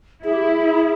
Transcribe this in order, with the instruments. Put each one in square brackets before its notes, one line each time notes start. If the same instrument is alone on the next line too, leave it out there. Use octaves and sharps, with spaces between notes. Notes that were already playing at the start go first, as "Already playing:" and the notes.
[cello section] E4 [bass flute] G#4
[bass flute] G4
G#4